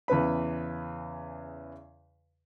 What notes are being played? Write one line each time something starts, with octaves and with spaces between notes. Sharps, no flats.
E2 C#3 B4 B5